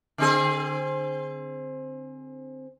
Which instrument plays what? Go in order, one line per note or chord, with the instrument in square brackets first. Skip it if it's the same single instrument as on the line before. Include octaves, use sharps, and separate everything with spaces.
[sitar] D3 C4 G#4